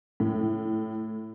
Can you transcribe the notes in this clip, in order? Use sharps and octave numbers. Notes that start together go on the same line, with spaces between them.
A2